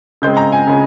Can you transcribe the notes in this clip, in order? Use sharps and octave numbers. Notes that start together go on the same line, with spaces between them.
C#3 G#3 C4 G6
A#5
G#5
C#3 G#3